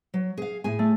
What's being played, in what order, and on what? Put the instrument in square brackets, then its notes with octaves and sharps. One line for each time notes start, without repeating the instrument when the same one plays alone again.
[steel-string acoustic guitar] F#3
G#4 F5
A2 G#4 G#5
[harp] A3